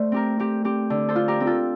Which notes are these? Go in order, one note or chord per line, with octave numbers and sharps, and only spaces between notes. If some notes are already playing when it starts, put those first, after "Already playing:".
Already playing: A3 C5 D5
C4 G4 A#4
C4 G4
C4 G4
D3
A4 C5
F4
G4 A#4
C4
F4 A4